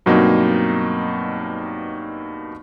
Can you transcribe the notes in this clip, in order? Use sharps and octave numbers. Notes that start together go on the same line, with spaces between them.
G2 B2 F#3 A#3 C4 D#4